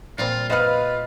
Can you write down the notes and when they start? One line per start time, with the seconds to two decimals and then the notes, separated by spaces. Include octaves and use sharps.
0.18 A#2 G3 C4 F4
0.50 F4 B4 C5 D#5 F5 F#5 F6